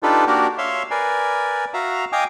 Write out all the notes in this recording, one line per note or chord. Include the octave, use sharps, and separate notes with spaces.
D4 D#4 F4 G4 A4 B4
A#3 D4 F#4 G4 A#4
C#5 E5 F5 C6
A#4 B4 D5 G#5
F#4 E5 F5 A#5
D#5 F5 G5 G#5 D6 D#6